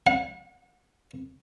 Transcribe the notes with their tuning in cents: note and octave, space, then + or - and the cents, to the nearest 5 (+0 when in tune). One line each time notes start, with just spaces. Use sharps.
F#5 -40